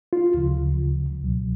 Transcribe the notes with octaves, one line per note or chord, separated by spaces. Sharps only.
F4
D2 C#3 F3
C#2 B2 F#3